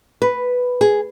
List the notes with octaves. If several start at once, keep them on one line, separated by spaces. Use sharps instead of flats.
B4
G#4